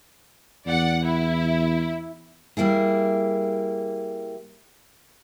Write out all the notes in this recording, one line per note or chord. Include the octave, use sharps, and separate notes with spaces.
E2 D5 F#5
E4
G3 A#3 E4 G#4